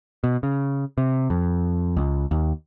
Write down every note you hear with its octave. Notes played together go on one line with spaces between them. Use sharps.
B2
C#3
C3
F2
C#2
D#2